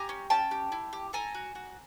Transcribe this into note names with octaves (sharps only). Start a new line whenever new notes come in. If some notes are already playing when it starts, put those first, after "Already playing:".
Already playing: G4 G#5 A#5
C#4
C#4 G5 A5
G4
E4
G4
A4 G#5 A#5
F#4
F#4